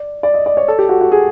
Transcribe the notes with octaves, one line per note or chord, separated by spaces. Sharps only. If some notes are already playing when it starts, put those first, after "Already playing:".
Already playing: D5
D5
D#5
D5
C#5
A4
G4
F#4
F#4
G#4